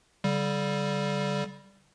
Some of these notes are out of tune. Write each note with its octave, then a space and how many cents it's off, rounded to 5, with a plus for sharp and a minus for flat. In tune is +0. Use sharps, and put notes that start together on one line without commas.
D3 -45 G3 -10